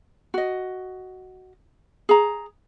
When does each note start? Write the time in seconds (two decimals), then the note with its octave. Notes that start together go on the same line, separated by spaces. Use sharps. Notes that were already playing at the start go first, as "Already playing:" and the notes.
0.34 F#4 D#5
2.09 G#4 A#5